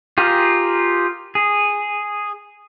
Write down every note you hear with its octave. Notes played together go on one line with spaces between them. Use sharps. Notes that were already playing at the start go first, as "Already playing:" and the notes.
F4 G4 G#4 A#4
G#4